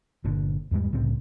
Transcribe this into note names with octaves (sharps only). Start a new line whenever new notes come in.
G1 A#2 D3
E2 G#2 G3 G#3
C2 A2 C#3 C4